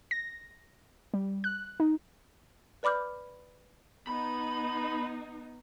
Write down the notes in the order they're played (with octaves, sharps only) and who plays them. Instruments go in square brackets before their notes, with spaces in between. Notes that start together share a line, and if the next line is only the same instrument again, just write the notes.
[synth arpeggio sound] A#6
G3
F#6
D#4
[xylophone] B4 D5 B5 D6 F6 G6
[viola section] B3 D#4 [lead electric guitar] B5